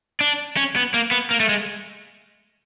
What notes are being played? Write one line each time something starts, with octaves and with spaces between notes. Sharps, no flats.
D4
C#4
B3
A#3
B3
A#3
A3
G#3